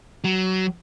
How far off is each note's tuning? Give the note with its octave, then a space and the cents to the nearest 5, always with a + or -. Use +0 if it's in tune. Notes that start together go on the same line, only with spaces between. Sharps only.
F#3 +20